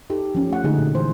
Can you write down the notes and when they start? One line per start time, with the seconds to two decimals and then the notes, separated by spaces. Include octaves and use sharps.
0.10 D#4 G4 A4
0.35 F3 C#4
0.49 A3 F#5
0.64 D3 G#3 A3 D#4 F#4 G#4
0.78 A#2
0.94 E3 C5